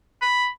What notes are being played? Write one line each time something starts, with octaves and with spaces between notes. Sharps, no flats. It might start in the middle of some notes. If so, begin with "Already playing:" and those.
B5